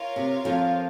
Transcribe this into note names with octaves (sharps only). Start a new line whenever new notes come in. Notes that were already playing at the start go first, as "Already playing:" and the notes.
Already playing: F4 A#4 C#5 F5
C3
F2 F3